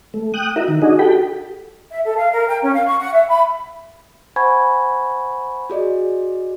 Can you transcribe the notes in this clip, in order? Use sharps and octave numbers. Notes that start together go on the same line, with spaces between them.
A3
G5 D#6 F#6
E4 F#4 A#4 D#5 E5
D#3
D4 D#4 F#4 G#4 D#5
F#4 G4 A4 G5 B5
E5
A4
F5
A#4
G5
C#4
F5
C#6
F#5
E5
B5
C5 F#5 G#5 B5 C#6 G#6
F#4 G#4 D5 D#5